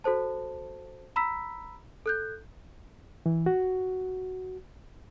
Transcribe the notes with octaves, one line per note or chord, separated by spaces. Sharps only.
F#4 A4 C5 A5
A#5 B5 E6 B6
A4 F#6 G6
E3
F#4